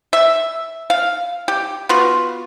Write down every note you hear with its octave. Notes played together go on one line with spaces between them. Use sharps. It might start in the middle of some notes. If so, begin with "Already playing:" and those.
E5
F5
G4
B3 F4 F#4